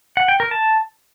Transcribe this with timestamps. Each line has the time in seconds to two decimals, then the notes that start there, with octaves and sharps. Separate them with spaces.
0.17 F#5
0.28 G5
0.40 A#4
0.51 A5